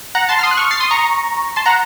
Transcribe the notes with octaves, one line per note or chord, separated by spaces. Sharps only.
F#5 A#5
A5 C6
F6
C6 D#6
F#6
C#6 F6
A6 C7
C6 D#6
A#5 C#6
A5 C6
F#5 A#5